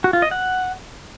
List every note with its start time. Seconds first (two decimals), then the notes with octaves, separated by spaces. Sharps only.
0.04 F#4
0.13 F4
0.22 D#5
0.31 F#5